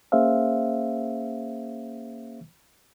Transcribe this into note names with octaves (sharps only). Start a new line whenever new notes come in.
A#3 C#4 G#4 C5 E5 F5